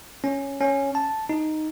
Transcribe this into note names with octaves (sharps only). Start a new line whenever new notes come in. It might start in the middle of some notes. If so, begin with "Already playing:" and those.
C#4
C#4
A5
D#4